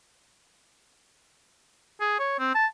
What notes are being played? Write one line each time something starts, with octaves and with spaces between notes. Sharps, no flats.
G#4
C#5
C4
A5